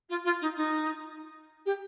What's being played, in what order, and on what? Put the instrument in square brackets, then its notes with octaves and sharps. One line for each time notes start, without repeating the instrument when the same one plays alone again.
[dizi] F4
F4
D#4
D#4
G4